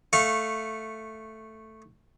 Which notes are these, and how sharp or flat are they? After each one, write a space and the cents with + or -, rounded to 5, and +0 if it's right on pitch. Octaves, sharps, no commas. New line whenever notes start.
A3 +0 F5 +0 C#6 -20